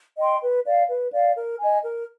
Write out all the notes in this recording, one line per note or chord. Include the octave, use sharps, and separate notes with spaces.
D#5 G5 C6
B4
D5 F5
B4
D5 F5
A#4
D#5 G#5
A#4